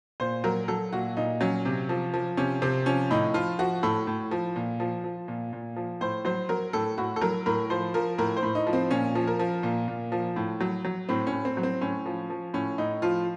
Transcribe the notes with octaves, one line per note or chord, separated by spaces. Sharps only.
A#2 C5
F#3 A#4
F#3 A4
A#2 F#4
A#2 D#4
F#3 C#4
C3
F3
F3
C3 C#4
C3 C4
F3 C#4
A2 D#4
F3 F4
F3 F#4
A2 A4
A2
F3
A#2
F3
F3
A#2
A#2
F3
A2 C5
F#3 C5
F#3 A#4
A2 A4
A2 F#4
A4
F#3 A#4
A2 A#4
F3 C5
F3 A#4
A2 A#4
C5
A2
D#4
F3
C4
A#2 C#4
F3
A#4
F3
A#2
A#2
F3
A2
F#3
F#3
A2 C4
C#4
A2
C4
F#3
C4
A2 C#4
F3
F3
A2 C#4
A2 D#4
F3 F4